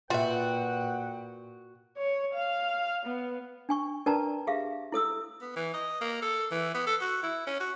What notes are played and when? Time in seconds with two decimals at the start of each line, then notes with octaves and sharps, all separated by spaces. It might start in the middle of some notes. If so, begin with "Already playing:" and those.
0.10 A#2 F4 F#4 B4 E5 F#5 G5
1.97 C#5
2.34 F5
3.06 B3
3.69 D4 G#5 C#6
4.06 D4 A#4 B4 D5 A5 A#5
4.47 G4 G#4 E5 F5
4.92 E4 A4 D#6 E6
5.41 B3
5.56 E3
5.74 D#5
6.01 A#3
6.22 A4
6.51 E3
6.74 B3
6.87 A4
7.01 F#4
7.23 E4
7.47 C#4
7.60 F#4